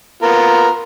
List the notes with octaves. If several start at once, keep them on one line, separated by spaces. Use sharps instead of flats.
B3 F4 A#4